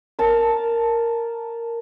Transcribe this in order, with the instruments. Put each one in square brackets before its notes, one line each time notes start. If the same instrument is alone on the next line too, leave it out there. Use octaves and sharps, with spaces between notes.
[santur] A#4 A5